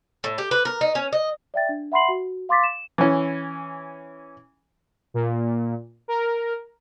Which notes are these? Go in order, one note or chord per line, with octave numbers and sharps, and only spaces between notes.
A2
G4
B4
A#4
D#4
C#4
D#5
D5 E5 G5 A6
D4
E5 F#5 B5 C6 C7 F#7
F#4
F5 C6 D6 A6 B6
E7
E3 C#4
A#2
A#4